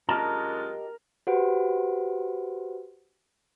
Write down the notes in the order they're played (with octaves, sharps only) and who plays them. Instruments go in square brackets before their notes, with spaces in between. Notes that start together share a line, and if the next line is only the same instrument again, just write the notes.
[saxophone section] F#2 G#3 F4 [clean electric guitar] G4 D#5 A5 [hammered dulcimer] A#4
[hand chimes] F#4 G4 B4 C5 F#5 D7